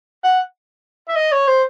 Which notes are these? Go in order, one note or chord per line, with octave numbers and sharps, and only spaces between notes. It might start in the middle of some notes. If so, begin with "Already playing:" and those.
F#5
E5
D#5
C#5
C5